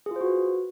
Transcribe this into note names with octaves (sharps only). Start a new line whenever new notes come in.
F4 F#4 G#4 B4 C5